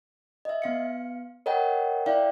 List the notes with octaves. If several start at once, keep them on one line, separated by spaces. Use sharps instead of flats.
D#5 E5
B3 F5 C#7
A#4 C#5 D#5 F#5 G5 A#5
E4 D5 E5 F5 G5 A#5